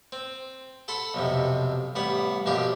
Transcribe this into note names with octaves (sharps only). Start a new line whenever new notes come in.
C4
A4 F#5 B5 C6
B1 F2 C3
A1 G3 B3 F#5
B1 F#2 A#2 F3 G4 C6